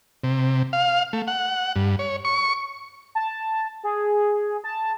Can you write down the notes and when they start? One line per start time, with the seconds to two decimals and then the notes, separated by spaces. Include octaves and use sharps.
0.24 C3
0.73 F5
1.13 A3
1.28 F#5
1.76 G2
1.99 C#5
2.25 C#6
3.15 A5
3.83 G#4
4.64 A5